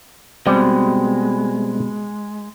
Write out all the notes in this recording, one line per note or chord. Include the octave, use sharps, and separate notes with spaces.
B2 G3 G#3 C4 G4